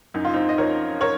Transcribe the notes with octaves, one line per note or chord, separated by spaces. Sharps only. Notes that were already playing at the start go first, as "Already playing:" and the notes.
F#2 D#4
F4
C4 D#4
D#5
F3 A#4 C#5
A#4 C#5